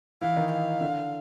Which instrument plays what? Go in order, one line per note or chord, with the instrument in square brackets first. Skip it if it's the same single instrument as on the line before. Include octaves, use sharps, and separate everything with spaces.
[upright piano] E3 E4 [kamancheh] F5
[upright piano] D#3 D#4
[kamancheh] F5
[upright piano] D3 D4